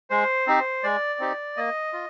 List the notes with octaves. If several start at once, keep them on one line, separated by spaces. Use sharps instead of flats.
G#3 C5
C4 D#4 G4
G#3 D5
C4 D#4 G4
A#3 D#5
F4